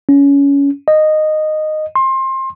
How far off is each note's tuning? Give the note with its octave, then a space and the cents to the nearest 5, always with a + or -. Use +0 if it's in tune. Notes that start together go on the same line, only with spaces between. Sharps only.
C#4 +20
D#5 -10
C6 +25